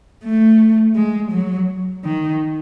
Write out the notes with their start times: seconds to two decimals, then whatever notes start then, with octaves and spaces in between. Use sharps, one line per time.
0.24 A3
0.95 G#3
1.31 F#3
2.04 D#3